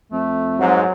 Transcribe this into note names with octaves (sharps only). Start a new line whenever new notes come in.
F2 A3
G#2 F#3